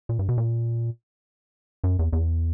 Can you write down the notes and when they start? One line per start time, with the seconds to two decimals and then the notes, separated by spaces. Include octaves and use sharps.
0.09 A#2
0.19 G2
0.29 B2
0.38 A#2
1.84 F#2
1.99 E2
2.13 E2